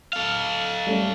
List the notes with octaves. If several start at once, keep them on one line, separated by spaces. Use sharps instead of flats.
A4 F5
G3 A3 C#4